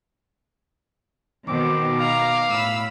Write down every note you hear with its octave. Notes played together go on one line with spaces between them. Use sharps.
B2 D#3 C4 D6
F5 A#5
A2 B5 E6